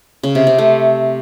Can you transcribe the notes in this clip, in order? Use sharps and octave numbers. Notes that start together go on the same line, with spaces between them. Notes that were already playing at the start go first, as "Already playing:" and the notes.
C#3
C3
C4
A3